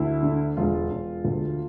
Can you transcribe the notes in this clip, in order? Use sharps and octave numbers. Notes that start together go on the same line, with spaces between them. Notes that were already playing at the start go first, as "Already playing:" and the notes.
Already playing: D2 E4
D3
E1 F4
E1
D2